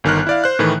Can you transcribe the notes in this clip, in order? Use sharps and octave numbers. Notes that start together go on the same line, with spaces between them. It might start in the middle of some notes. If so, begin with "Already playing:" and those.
G1 D#3 F6 F#6
E4 D5 F5
C5 F#6
A2 D#3 E3 A3